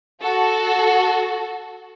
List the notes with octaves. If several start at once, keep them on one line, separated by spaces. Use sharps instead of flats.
F#4 A4